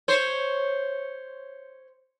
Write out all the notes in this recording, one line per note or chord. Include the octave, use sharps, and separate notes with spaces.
C5 C#5